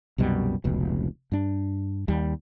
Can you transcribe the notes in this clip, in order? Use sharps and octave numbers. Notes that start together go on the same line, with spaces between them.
C2 F#2 B2 G3
F1 C#2 B2
G2 D4
D#2 G3